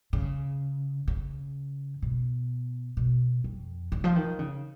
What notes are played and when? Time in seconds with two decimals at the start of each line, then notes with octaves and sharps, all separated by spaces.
0.13 C#3
1.08 C#3
2.02 B2
2.97 B2
3.44 F2
3.92 C#3
4.04 F3
4.16 D#3
4.39 C#3